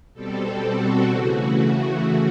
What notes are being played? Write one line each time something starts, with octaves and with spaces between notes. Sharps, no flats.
B2 G3 C4 A4
F#4
C#3 E3 A3